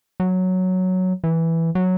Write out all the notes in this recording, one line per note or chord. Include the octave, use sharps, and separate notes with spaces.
F#3
E3
F#3